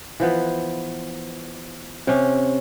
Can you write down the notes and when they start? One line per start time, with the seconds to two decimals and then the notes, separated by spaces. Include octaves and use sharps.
0.20 E3 F3 B3
2.07 C3 C#4